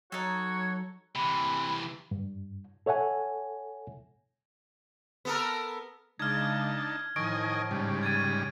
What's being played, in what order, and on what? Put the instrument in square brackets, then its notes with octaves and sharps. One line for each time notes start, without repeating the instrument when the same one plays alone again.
[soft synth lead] F#3 [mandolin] D#4 A4 [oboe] F#4 [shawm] C#5
[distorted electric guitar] C3 E3 [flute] B5
[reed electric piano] G2
A4 C#5 E5 F#5 G#5
[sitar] B3 A4 A#4
[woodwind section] C#3 G#3 [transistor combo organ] D4 D#4 A5 [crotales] F6 G#6
[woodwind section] A2 F3 [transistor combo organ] D#3 D#5 G#5 [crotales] C#6 D7
[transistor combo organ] G#2 C#3 G3
[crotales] G#6 A6 D#7